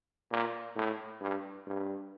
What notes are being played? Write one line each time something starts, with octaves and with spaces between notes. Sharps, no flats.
A#2
A2
G2
G2